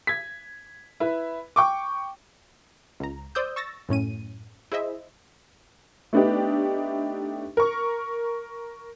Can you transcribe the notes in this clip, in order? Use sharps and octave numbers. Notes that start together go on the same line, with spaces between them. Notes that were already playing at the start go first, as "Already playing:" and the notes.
G#6 B6
E4 B4
G5 C#6 D6
C#2 A#5
C5 D5 D#6 E6 G6
C#6 E6 A6 A#6
F#2 A2 C#4 D#7
E4 G#4 C5 D#5 E5
A3 B3 D4 D#4 G4
A#4 C#6